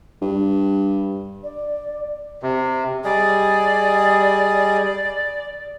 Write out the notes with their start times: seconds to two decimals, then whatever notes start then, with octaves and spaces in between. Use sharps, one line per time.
0.22 G2
1.43 D5
2.43 C3
3.04 G3 G#4 D5 D#5